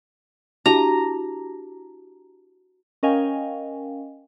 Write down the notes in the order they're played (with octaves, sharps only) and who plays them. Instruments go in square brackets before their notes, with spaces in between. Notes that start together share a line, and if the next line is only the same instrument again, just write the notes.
[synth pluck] D4 E4 G4 [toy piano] F#4 A5 D6 [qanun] A#5
[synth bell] C#4 A#4 D#5 F5 G5 G#5